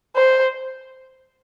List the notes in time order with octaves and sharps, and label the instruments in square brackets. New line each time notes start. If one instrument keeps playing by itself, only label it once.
[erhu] C5